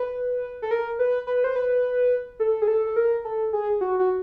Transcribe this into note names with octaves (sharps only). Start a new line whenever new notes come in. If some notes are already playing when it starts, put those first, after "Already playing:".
Already playing: B4
A4
A#4
B4
B4
C5
B4
A4
G#4
A4
A4
A#4
A4
G#4
F#4
F#4